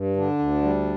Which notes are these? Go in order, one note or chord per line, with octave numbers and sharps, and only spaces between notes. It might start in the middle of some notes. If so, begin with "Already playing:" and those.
Already playing: G2
D3 D4
D2
G3